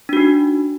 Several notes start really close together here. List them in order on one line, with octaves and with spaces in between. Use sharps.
D4 F#4 D#4